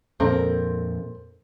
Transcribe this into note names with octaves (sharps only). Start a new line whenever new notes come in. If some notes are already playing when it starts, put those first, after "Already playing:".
F2 A#2 C4 A4 A#4